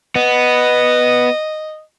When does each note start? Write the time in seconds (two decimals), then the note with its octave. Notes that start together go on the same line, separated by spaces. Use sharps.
0.16 B3 D#5